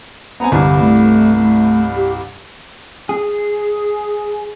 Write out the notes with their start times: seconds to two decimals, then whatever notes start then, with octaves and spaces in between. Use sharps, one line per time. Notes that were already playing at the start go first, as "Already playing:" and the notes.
0.40 B3 C4 G#5 A#5
0.52 C2 G2 D3 E3
0.81 A3
1.37 A3
1.96 G4
3.09 G#4